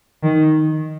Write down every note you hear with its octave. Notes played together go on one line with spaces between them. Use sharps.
D#3